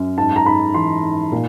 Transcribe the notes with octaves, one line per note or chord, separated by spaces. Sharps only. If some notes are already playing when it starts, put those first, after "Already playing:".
Already playing: F#2
G#2 A5
A#5
G#2 B5
E3 C6
G#2
A#2